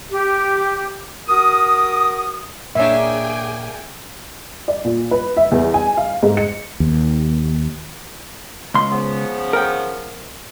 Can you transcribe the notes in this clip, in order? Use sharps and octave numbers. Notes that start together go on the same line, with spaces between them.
G4
F#4 A#4 D#6
A#2 A#3 D4 G#4 C#5 E5 G5 G#5
D5
A#2
B4
E5
E2
G#5
F5
G#2
C#7
D#2
C#2 C6
C#3 F3 B3
A#4 G5